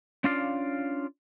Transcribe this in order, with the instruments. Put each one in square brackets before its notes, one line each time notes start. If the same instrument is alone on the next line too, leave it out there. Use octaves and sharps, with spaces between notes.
[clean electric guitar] C#4 D4 F4 D5 F5